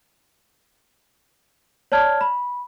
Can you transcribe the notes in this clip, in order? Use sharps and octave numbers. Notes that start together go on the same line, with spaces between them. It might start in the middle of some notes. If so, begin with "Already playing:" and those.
C#5 D5 A5 F6 G#6
B5